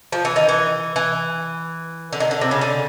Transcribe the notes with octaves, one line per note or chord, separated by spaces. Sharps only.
F3
E3
D#3
E3
E3
D3
D#3
D3
C3
C#3
D3